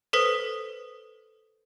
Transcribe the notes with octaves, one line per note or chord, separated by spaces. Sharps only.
A4 B4 C5 D#6 B6